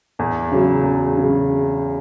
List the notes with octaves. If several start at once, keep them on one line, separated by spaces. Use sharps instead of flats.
E2
C#3 F#3
E2
C#3 F#3